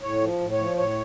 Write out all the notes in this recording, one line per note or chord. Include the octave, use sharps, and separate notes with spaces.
A2 C#5
F3
A2
C#5
F3
A2 C#5